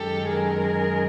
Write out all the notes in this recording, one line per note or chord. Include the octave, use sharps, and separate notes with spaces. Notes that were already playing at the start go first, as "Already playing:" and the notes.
Already playing: F#2 D#3 G#3 G4 A4
G#4 A#4